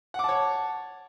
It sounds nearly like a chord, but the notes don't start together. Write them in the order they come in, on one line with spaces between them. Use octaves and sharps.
F#5 D6 A5 C#5